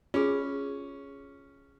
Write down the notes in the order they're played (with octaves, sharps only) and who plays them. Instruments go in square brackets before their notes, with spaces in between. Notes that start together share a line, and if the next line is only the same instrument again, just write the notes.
[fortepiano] C#4 [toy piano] F4 G#4